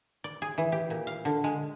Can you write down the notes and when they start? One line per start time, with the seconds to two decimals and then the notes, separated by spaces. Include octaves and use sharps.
0.24 D5
0.42 G#4
0.58 E3
0.72 G4
0.90 A#2
1.07 F5
1.25 D3
1.44 G#3